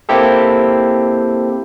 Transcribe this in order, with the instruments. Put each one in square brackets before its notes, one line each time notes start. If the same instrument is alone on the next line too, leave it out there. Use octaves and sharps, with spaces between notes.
[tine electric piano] A#3 C4 E4 G4 A4